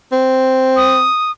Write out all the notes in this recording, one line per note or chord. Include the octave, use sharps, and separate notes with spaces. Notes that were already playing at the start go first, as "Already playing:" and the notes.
C4
D#6